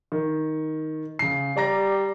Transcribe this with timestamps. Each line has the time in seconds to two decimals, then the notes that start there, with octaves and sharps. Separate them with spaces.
0.12 D#3
1.19 C#3 C7
1.56 G3 D5 A#5 A#6